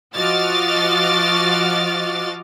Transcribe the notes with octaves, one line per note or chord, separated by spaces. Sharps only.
F3 F#4 D#5 D6 F6 A6